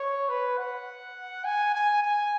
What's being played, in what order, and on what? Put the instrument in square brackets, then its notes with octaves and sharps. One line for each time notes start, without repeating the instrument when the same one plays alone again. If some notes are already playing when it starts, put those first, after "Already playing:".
Already playing: [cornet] C#5
B4
F#5
G#5
G#5
G#5